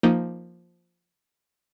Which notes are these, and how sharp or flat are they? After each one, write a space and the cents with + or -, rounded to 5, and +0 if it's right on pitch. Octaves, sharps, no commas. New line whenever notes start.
F3 +0 A#3 +0 D#4 +0